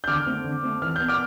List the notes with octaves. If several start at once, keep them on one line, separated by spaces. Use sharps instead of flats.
G6
D3 D6 F6
A3 C4
D3
A3 C4
E3 F6
B3 G6
D6 F6